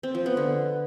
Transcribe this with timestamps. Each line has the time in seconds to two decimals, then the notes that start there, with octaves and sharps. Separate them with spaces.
0.03 C4
0.15 F3
0.26 B3
0.37 D3